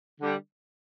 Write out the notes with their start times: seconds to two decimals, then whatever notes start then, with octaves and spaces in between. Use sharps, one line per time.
0.20 D3 G3